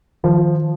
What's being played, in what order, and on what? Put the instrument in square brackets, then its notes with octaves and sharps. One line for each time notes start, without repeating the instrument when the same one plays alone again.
[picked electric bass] D#3 [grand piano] F3